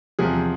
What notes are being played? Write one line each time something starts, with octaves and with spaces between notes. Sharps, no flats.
E2 C3 F3 G#4